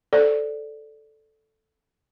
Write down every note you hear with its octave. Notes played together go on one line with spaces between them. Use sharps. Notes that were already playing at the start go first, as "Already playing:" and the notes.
A4 C5 D5